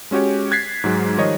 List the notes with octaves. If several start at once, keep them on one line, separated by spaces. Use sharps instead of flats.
G#3 C#4 F#4 G4 C#5
F#6 G#6 A6 B6 C7
G#2 F#3 G#3
D#3 F3 G3 C#5 D#5